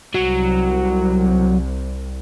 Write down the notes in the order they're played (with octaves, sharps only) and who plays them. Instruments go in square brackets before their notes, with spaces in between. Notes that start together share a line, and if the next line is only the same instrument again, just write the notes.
[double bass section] C2 [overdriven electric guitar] F#3